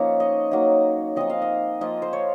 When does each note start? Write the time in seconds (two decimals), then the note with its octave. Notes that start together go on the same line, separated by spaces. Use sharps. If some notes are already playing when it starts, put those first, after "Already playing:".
Already playing: F3 A#3 C#4 D#4 C#5
0.20 D#5
0.51 F#3 A#3 D#4
1.16 F3 C4 D#4 D#5
1.30 F5
1.42 D#5
1.81 F3 A#3 F4 D#5
2.02 C5
2.13 C#5